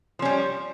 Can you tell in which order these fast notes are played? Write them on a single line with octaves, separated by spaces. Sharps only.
F3 C#4 G3